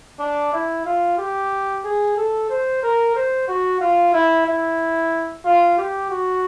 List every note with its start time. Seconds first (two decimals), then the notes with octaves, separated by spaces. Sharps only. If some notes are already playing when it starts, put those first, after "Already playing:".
0.19 D4
0.53 E4
0.85 F4
1.18 G4
1.84 G#4
2.17 A4
2.49 C5
2.83 A#4
3.15 C5
3.48 F#4
3.80 F4
4.13 E4
4.46 E4
5.45 F4
5.78 G4
6.10 F#4